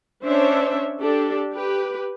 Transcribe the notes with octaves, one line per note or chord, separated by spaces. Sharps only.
C#4 D4 C5 C#5 E5
D4 G4 A4
G4 B4